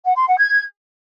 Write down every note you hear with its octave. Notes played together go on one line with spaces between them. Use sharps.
F#5
C6
F#5
G#6